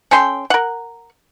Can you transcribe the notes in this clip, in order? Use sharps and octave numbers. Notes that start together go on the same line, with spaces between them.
C#4 A4 G5 C6
A#4 F#5